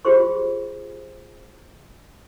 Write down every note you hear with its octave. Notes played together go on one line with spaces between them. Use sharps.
F4 G4 G#4 C5 C#6